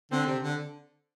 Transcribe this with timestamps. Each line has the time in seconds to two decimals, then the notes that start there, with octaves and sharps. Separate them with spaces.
0.11 D3 C4
0.27 C3
0.43 D3